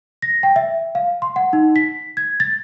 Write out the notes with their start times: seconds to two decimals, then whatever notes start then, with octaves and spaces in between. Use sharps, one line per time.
0.22 A#6
0.43 G5
0.56 E5
0.95 F5
1.22 C6
1.36 F#5
1.53 D#4
1.76 B6
2.17 G#6
2.40 A6